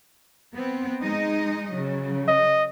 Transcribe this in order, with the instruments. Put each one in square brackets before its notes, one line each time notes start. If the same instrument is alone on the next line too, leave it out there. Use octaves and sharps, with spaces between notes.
[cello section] B3 C4
G#3 D#4 D#5
C#3 F#3
[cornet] D#5